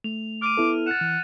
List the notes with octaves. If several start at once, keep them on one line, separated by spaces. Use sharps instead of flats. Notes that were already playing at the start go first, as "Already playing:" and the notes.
A3 F7
D6 F6 D#7
B3 E4 A4
F#5 A6 E7
E3